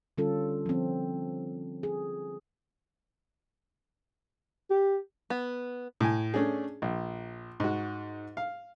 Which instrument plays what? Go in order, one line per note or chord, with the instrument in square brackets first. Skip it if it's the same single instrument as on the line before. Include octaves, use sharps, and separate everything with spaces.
[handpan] D3 G3 C#4 F4 A4
F3 C4
G#4
[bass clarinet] G4
[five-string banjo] B3
[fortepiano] A2 G#5
A3 C#4 D4 G#4
A#1
G#2 F#4
F5